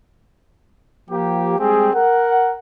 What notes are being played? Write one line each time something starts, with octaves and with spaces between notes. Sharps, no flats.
F3 A#3 G4
G3 G#3 C4 G4 G#4
A#4 F#5